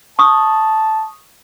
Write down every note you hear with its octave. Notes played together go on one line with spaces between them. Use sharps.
A5 C#6 D#6